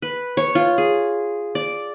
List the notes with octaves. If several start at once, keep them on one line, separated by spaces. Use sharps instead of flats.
B4
C#5
F4
G#4
D5